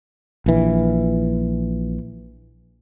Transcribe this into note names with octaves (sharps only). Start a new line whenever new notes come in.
A#1 E3